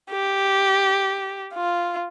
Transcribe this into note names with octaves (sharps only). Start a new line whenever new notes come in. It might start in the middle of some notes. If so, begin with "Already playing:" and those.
G4
F4